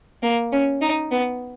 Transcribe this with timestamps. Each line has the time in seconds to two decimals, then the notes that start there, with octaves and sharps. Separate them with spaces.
0.23 A#3
0.52 C#4
0.82 D#4
1.11 B3